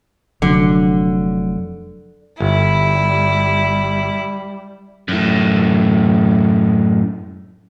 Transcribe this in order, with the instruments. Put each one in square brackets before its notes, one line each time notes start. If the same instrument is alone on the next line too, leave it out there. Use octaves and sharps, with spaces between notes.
[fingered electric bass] F1 F#3 [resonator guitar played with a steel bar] D3
[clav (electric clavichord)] G1 [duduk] G3 [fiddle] E4
[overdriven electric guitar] F#2 A2